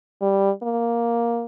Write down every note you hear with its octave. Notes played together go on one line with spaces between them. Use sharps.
G3
A#3